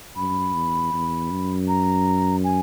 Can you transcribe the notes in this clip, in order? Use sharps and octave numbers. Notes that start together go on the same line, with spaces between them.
F#2 B5
E2
E2
F#2
A#5
G#5